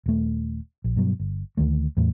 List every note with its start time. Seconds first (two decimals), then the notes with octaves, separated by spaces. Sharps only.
0.06 D#1 A3
0.84 A#1
0.96 G2 B2 F#3
1.20 G1
1.57 D2 D#3 A3
1.97 E2 A2